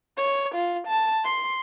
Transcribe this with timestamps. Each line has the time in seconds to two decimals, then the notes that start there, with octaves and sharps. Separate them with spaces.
0.17 C#5
0.55 F4
0.88 A5
1.25 C6